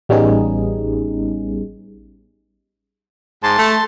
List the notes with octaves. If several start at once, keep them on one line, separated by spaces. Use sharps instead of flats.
A1 G3 B3 C#4 D#4 G#4
G#2 A5 C6
A3